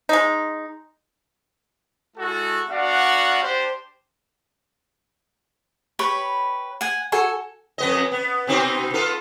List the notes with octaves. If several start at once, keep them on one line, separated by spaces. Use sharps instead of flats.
G#3 D#4
G#3 E4 F#4 A4
B3 D4 F#4 D5 F5 F#5
D4 G4 C5
G4 B4 C#5 B5
F#5 G#5
F#4 A4 G#5
F2 B3 D#5
B3
B2 C4 D#4
B3 F4 A4